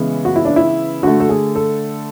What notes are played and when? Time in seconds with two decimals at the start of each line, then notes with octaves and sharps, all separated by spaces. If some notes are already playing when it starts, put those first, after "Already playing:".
Already playing: C#3 E3 G#3 B3
0.25 F#4
0.36 E4
0.45 D4
0.56 E4
1.03 D3 A3 F#4
1.20 A4
1.29 G#4
1.56 A4